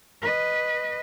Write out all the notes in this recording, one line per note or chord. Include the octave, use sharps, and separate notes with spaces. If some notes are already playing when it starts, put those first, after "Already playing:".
B4 D#5